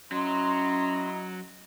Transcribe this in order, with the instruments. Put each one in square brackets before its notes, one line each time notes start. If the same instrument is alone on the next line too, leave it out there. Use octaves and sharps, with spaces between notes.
[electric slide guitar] F#3 [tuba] C#4 [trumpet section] E4 D#5 A#5 [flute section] C6